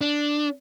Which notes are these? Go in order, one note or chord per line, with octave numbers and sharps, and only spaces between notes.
D4